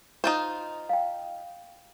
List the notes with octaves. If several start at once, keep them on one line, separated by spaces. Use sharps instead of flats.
D#4 F4 C5
F5 G5